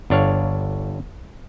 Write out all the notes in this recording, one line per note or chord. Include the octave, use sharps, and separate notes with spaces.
G1 D4 C#5 F5